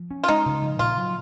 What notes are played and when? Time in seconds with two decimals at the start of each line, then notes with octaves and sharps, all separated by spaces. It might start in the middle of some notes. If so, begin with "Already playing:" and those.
Already playing: F3
0.11 C#4
0.24 F4
0.28 G#3 D#4
0.46 C#3
0.62 F3
0.79 A#2 F4
0.97 F#3